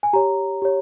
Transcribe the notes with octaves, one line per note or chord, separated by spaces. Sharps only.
G#5
G4 C#5 A#5
G4 C#5